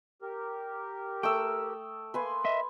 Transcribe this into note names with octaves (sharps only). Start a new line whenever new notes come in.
G4 A#4
A3 G5 D#6 E6
A#3 B4 G#5 C6
D#5 E5